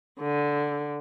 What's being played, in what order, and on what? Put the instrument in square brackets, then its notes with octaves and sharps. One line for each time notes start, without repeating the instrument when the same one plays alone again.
[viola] D3